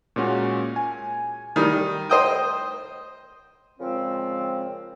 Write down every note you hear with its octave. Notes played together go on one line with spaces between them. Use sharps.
A#2 G#3 C#4 F#4
G#5
D#3 G3
C5 D#5 G5
A#2 C#3 F3 G#3 C4